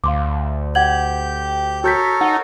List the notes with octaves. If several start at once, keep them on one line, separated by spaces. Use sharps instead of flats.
D2 F5 C6 D6
G4 F#5 G6 G#6 F#7
F#4 A4 A#4 C#5 G6 B6
D#4 F#5